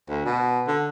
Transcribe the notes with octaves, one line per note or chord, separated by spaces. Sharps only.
D2
B2
D3